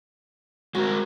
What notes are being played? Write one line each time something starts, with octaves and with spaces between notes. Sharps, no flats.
G#3 C4 F#4 A#4